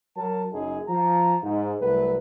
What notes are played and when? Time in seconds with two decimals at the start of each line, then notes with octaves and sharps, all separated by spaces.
0.17 F#3 A#4 A5
0.53 F#1 F#2 F#3 D#4 G#4
0.88 F3 A#5
1.43 G#2
1.81 C2 F#3 A3 B4